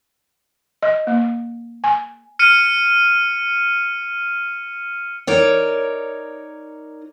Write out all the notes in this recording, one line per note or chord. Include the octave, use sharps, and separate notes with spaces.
D#5
A#3
G#5
F6 C#7 D#7
D#4 A#4 C#5 D5